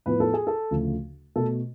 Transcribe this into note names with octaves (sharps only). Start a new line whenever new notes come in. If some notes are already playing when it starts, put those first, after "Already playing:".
A2 F3 B3 B4
A4
G#4
A4
D2 C#3 F3 A3
B2 A3 A4